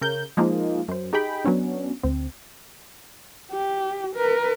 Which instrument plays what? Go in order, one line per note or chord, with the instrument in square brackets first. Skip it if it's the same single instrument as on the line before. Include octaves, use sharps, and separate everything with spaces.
[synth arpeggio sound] C#3 A#4 G6
F3 G#3 A#3 D#4 F4
F#2 C5
D#4 G4 G#4 G5 B5
F#3 B3 C#4 D4
D2 C4
[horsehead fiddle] G4
A#4 B4